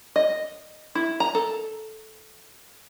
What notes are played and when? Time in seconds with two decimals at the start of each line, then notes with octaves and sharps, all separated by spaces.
0.16 D#5
0.95 E4
1.20 A#5
1.35 A4